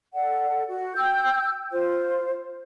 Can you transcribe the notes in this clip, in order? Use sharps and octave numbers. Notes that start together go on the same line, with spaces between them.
A4 D5 F#5
F#4
G5 E6 G6
F4 C5